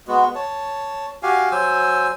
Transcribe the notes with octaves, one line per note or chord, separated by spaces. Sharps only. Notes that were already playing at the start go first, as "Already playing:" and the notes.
G#3 B3 F#4
C#5 A5
F#4 G4 F5 G#5
F#3 C5 G#5 E6